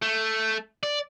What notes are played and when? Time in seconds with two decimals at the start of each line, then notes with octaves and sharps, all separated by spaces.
0.02 A3
0.83 D5